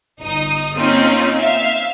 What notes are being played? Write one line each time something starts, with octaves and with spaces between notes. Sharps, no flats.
G1 D#4 D#6
A#3 C4 C#4 D#4 F4
E5 F5